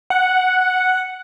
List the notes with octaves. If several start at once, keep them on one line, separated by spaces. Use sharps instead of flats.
F#5